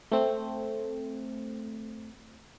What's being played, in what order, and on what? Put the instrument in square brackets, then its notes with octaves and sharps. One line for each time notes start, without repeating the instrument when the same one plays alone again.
[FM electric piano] A3 C4